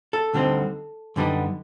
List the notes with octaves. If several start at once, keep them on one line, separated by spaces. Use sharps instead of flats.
A4
D2 D3 G3 C4 D#4
F#2 D3 G3 B3 D#4